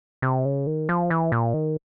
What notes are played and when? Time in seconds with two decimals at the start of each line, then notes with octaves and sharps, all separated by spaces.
0.22 C3
0.45 C#3
0.67 D#3
0.89 F3
1.10 E3
1.32 A#2
1.54 D#3